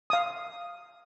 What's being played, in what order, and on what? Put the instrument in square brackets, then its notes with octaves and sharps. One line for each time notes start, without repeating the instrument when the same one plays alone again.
[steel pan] F5 D#6